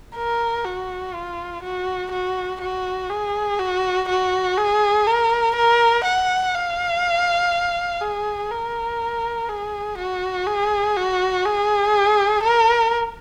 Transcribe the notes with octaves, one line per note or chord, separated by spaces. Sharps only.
A#4
F#4
F4
F#4
F#4
F#4
G#4
F#4
F#4
G#4
A#4
A#4
F#5
F5
G#4
A#4
G#4
F#4
G#4
F#4
G#4
A#4